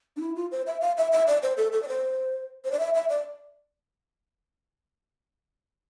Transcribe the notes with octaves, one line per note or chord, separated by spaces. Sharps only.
D4
E4
F4
C5
E5
F5
E5
E5
D5
C5
A4
A4
D5
C5
C5
D5
E5
E5
D5